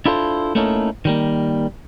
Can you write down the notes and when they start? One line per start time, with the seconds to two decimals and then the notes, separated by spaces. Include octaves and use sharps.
0.06 D4 E4 F4 A4 B4 C5
0.55 A3 A#3 C#4 D#4 E4 A4
1.05 D#3 G3 A#3